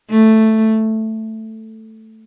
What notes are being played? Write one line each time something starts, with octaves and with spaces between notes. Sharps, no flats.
A3